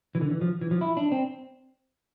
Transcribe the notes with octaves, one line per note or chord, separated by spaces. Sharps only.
E3
D3
E3
F3
E3
F3
E4
D4
C4